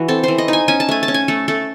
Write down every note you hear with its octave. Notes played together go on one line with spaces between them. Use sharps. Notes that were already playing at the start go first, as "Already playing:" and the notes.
Already playing: E3 F#4
C4 A4
E3 C5
D#5
D#4 G#5
C#4 G#5
A5
A3 G#5
A5
C#4
G#5
A3 A4
A3 A4